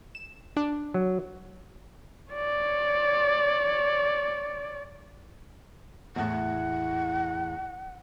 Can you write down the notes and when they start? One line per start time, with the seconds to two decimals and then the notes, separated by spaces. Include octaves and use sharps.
0.15 E7
0.57 D4
0.94 F#3
2.31 C#5 D5
6.16 E2 A2 F#5